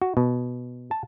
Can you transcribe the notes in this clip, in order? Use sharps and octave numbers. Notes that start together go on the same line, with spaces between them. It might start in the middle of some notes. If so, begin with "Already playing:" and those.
F#4
B2
A5